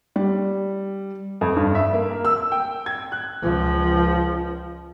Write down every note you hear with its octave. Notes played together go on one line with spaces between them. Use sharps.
G3
F2
G2
E5
A#3
A#4
E6
G5
G#6
F#6
C#2 F3